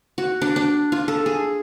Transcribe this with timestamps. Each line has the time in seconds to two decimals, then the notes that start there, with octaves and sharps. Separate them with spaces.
0.18 F#4
0.42 D4
0.56 D4
0.92 F4
1.08 A4
1.26 G#4